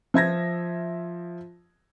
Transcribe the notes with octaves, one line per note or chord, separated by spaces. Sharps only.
F3 E5 G#6 A#6